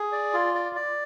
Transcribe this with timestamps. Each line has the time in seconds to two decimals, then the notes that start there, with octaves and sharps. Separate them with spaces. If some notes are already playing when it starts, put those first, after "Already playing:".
Already playing: G#4
0.12 D5
0.33 F4
0.55 D5
0.76 D5